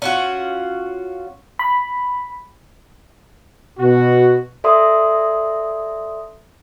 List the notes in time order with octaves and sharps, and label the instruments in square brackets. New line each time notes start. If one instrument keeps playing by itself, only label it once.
[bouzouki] C#4 F4 F#4
[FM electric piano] B5
[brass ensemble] B2 F#4
[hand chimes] A4 D5 E5 C6 D#6